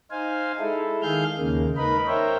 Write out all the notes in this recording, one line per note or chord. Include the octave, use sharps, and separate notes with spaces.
D#4 C5 F5 G#5
G#3 E4 A4
D#3 G#4 F5 F6 G6
D#2 C#3 G#3 A#3
D#4 A#4 B4 D#5 B5
A#4 C5 C#5 E5 G5